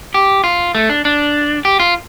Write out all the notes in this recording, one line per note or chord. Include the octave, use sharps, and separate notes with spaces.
G4
F4
A3
D4
D4
G4
F4